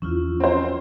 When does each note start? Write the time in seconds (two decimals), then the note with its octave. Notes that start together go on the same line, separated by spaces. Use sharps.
0.02 E2 F3 C#4 E4 F4
0.40 C4 C5